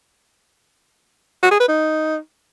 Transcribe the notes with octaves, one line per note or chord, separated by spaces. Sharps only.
F#4
G#4
B4
D#4